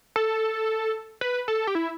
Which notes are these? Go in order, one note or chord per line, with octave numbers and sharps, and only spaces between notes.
A4
B4
A4
G4
E4